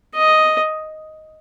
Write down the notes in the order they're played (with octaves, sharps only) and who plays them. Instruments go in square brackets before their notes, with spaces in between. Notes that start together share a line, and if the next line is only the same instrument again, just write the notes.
[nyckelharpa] D#5